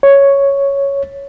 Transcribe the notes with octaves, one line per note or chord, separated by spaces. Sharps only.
C#5